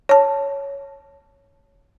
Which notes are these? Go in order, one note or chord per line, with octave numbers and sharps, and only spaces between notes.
C#5 A5